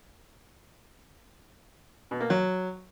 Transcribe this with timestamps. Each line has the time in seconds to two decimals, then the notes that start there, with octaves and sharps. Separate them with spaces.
2.11 B2
2.21 A#3
2.30 F#3